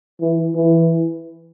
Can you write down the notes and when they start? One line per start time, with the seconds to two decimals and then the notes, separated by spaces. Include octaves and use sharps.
0.21 E3
0.55 E3